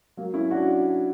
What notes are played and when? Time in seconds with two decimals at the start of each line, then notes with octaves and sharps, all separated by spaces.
0.17 F#3 A#3
0.34 C#4 E4
0.51 D4 F#4
0.67 D4 F#4